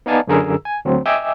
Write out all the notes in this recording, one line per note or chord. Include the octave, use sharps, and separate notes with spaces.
B3 D#4 D5 F5 G#5 A5
F#2 D3 G#4 A#4 E6
G#5
D2 F#3 C4
D#5 E5 G5 G#5 D6 E6